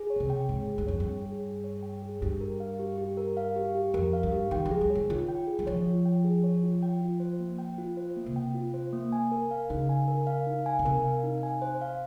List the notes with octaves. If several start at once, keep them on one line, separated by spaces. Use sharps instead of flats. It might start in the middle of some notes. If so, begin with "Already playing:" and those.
Already playing: G#4
C#5
C#3
C3
G5
G#2 G#4
G#4
G2
F2 C#5
G2
G5
G#4
G#4
C#5
G5
G#4
G2 G4
A#4
F5
G4
G4
A#4
F5
G4
G4
F2 A#4
F5
G2
G4
D#3 G5
F3
G#4
G3
C#5
D#3
D#3 F4
G5
G#4
G3
F3 C#5
F4
G5
G#4
C#5
F4
G5
F4
C5
A#3
G5
F4
C5
A#3
C3
G5
F4
C5
A#3
G#5
A#4
F5
C#3 D#4
G#5
A#4
F5
D#4
G#5
C#3
C3 A#4
F5
D#4
G#5
C5
F5